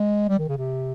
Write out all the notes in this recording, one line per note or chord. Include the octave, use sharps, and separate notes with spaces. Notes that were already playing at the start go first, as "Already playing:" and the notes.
Already playing: G#3
G3
D#3
C#3
C3